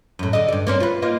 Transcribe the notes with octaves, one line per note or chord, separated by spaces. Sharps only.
F#2 A2
D3 D#5
G2 D5
A#3 C4 C#4
F4 B4
A#3 D#4 F4